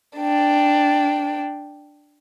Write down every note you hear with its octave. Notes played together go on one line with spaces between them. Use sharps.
D4 G5